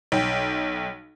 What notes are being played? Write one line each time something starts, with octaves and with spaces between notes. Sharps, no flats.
B1 G5